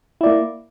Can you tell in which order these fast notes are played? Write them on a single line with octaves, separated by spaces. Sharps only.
E4 D5 A#3